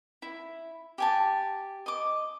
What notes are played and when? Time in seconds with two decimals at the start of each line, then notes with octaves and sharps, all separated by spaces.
0.22 E4
0.98 G4 G#5 A5
1.86 D#5 D6